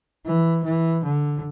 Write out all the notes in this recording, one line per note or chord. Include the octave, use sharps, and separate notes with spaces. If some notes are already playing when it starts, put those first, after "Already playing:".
E3
E3
D3